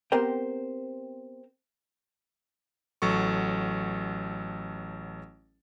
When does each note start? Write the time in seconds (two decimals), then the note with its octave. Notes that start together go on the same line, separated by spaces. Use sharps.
0.12 B3 C4 G4 A#4 C5 G5
3.02 A1 F#3 A4 C#6